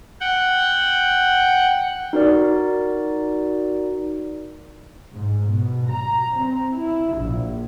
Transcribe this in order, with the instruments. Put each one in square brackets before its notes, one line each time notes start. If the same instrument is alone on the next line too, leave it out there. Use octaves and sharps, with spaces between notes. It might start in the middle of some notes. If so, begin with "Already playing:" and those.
[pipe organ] F#5 G5
[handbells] D#4 F#4 A#4 D5
[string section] G#2
B2
A#5
C4
E4
A#1